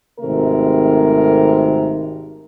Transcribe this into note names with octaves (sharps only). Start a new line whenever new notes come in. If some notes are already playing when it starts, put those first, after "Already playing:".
G#1 C3 D#3 A3 A#4